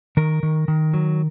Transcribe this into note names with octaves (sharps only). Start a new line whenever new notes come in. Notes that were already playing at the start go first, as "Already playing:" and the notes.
D#3 A#4
D#3
D#3
F#3